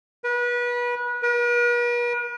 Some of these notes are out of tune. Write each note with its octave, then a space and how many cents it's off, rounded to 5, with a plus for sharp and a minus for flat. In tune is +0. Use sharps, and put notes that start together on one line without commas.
B4 -30
B4 -45